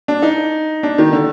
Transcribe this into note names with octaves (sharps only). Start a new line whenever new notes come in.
D4
D#4
D4
D#3
D3